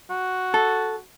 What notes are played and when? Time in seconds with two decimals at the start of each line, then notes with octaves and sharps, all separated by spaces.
0.10 F#4
0.54 A4